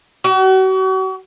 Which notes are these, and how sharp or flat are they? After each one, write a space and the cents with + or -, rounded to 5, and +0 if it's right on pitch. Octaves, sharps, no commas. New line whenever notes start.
F#4 +40